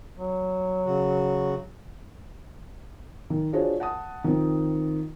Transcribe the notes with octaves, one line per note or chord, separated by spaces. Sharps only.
F#3
C#3 F#4
D#3
D4 F4 F#4 G#4 C5 C#5
F#5 A5 D#6
D#3 F3 C4